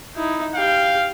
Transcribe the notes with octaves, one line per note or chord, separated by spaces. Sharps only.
D#4 E4
G4 F5 G5